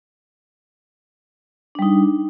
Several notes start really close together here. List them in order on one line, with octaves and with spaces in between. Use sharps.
D4 G3 D#4